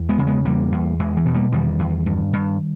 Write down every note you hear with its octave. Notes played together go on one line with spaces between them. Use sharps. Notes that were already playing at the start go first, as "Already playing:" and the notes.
Already playing: E2
G#3 B3
C#3
G#3 B3
E2 G3 A#3
E2
E2 E3 G#3
E3
B2
G3 A#3
E2 D#3 G3
E2
G2
G2